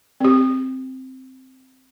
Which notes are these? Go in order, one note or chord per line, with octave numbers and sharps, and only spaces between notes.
C4 G4